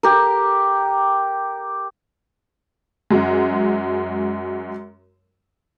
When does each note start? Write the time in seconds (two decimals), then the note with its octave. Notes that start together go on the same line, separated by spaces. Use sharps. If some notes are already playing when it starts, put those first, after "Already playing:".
0.03 G4 A#4
3.10 F#2 G#3